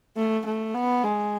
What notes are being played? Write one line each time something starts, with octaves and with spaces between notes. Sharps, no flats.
A3
A3
B3
G#3